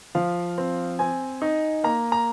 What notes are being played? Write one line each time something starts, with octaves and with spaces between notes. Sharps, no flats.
F3 F5
C4
C4 G#5
D#4
A#3 A#5
A#5